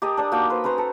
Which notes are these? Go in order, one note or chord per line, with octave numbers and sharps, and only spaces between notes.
G4 A#4 D#5 A5
D4 D5 D#6
A#3 D#4 F#4 G5
B4 C5
C#4 B4 C5 A#5
A4